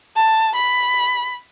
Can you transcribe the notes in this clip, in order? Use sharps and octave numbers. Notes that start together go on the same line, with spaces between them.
A5
B5